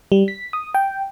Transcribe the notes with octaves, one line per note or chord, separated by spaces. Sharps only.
G3
B6
D#6
G5